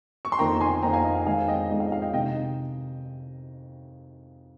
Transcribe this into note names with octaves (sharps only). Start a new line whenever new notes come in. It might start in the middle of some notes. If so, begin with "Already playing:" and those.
C#6
C6
F2 D#3 A#3 G5 A#5
G#5 C6
F2 D#3 A#3 G5 A#5
F5 G#5
D#5
F5
F2 D#3 G#3 F5 G#5
D#5 G5
F2 D#3 G#3 D#5
F5
F5
D#5 G5
C3 D#3 D#5 G5